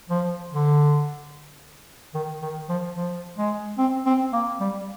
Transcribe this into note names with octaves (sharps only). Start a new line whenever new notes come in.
F3
D3
D#3
D#3
F3
F3
G#3
C4
C4
A#3
G3